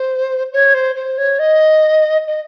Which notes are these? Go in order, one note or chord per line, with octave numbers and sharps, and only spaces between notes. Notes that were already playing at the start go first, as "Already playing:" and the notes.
Already playing: C5
C#5
C5
C5
C#5
D#5
D#5